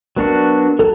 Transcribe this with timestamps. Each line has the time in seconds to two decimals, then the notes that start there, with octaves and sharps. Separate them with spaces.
0.16 F#3 B3 D4 F#4 A#4
0.79 F#3 A4